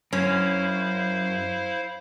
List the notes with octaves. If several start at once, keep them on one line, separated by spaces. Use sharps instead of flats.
F#2 C#4 E4 C5 F5